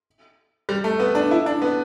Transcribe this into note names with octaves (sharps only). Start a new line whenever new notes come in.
G3
A3
B3
D4
E4
D4
B3